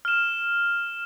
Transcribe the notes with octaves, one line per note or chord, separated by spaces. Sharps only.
F6 E7